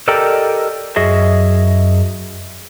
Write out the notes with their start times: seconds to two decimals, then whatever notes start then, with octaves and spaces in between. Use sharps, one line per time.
0.08 G4 A4 A#4 D5 D#5 G5
0.96 F#2 F#4 G#4 D#5 E5